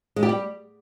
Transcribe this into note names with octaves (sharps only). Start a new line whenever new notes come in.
G#3
G4
G3